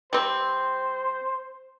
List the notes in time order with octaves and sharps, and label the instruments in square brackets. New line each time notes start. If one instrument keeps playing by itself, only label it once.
[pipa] G3 C4 [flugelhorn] C5